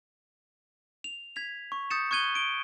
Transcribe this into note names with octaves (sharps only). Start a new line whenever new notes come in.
F7
G#6 B6 F7
C#6
D#6 G6 A6 C#7 E7
C#6 F#6 G#6 D#7 G7
D7 G7